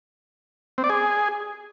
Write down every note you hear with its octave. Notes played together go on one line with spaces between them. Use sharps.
C4
D5
G#4